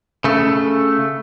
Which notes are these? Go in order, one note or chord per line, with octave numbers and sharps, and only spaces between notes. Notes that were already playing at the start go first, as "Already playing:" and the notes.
C#3 A3